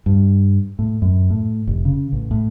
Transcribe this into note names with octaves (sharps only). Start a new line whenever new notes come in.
G2
A2
F#2
A2
F1
C#3
A1
A2